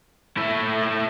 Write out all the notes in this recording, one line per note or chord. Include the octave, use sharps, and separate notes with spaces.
A3 E4